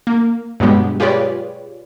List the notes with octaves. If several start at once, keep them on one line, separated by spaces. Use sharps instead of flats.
A#3
G2 B2 F#3 G#3 B3 G4
F4 G4 G#4 B4 C#5 D5